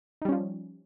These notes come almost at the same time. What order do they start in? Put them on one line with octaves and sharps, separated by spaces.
D#4 G3 C#4 F3